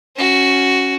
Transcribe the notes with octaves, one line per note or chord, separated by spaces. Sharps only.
C#4 F#4